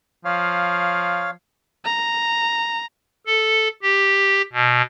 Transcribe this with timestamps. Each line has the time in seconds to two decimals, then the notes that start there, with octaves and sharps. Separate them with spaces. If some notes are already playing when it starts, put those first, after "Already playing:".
0.25 F3 C#5 F5
1.85 A#5
3.26 A4
3.82 G4
4.53 B2